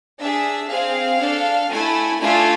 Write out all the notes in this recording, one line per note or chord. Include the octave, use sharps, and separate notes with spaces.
D4 G#4 E5
C4 G#4 F5
D4 A4
A3 E4 A4 G#5
A3 D4 F4 A4 G#5